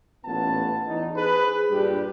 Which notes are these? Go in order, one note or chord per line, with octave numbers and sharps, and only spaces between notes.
A1 A#2 B3 C#4 F#5 A5
E2 D#4
G#4 B4 C5
G2 A#2 G3 D4 G4 B4